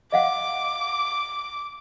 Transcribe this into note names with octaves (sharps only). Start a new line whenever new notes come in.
D#5 F5 F#5 D6